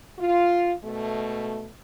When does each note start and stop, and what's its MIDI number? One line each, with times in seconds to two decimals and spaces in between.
0.18 0.71 65
0.83 1.65 44
0.83 1.65 47
0.83 1.65 57